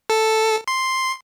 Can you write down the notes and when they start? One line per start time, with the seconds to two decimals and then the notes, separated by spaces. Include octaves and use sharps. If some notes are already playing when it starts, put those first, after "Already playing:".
0.10 A4
0.68 C6